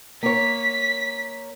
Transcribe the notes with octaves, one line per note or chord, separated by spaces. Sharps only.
A#3 C#5 B6